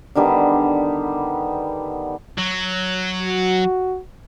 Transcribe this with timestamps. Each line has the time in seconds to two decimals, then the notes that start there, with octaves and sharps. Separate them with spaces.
0.15 D3 D#3 G3 B3
2.38 F#3
3.23 F#4